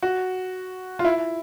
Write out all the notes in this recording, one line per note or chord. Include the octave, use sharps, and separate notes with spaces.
F#4
F4
E4